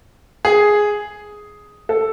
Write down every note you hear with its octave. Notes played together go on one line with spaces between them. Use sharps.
G#4
A4